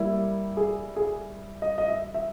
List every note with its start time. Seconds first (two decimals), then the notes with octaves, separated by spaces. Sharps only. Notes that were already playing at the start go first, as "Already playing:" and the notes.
Already playing: G3 A#3 E4
0.57 G#4
0.96 G#4
1.62 D#5
1.78 D#5
1.88 E5
2.14 E5